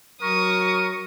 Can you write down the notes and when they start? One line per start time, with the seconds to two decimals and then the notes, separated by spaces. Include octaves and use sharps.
0.22 F#3 A#4 C#6 D#6